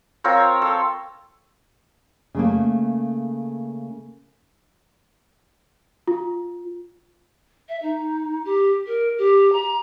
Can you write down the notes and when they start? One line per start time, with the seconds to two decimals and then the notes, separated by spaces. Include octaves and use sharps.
0.24 C4 F4 A#4 C#5
0.62 A4
2.35 C#3 A3 A#3
6.08 F4
7.68 E5
7.82 D#4
8.44 G4
8.86 A#4
9.17 G4
9.52 A#5